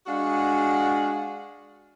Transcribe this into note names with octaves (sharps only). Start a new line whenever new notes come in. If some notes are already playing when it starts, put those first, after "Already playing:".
G#3 D4 F#4 F5 F#5